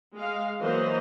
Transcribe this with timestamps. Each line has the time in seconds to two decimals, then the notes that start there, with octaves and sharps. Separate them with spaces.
0.15 G#3 F5
0.60 E3 F#3 A#3 F#4 C5 D#5